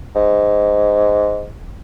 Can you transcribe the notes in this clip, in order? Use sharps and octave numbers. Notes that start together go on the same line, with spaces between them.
G#2